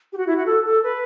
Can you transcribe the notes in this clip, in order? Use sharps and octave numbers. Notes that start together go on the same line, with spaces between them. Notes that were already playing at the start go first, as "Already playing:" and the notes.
G4
F#4
E4
F#4
A4
A4
B4